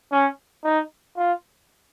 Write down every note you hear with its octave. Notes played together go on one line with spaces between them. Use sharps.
C#4
D#4
F4